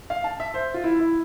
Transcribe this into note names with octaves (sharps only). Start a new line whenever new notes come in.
F5
A5
E5
C5
F4
E4
E4